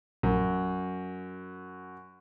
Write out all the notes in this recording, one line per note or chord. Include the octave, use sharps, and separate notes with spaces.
A#1 F#2